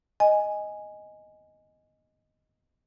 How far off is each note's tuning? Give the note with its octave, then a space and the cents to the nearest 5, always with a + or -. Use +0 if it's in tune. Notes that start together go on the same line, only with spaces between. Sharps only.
D#5 +0 G#5 +0